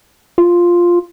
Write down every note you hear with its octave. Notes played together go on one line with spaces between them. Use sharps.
F4